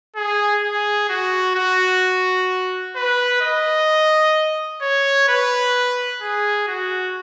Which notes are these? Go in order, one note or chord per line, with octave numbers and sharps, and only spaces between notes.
G#4
G#4
F#4
F#4
B4
D#5
C#5
B4
G#4
F#4